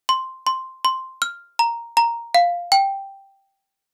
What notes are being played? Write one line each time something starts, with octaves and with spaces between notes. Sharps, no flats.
C6
C6
C6
F6
A#5
A#5
F5
G5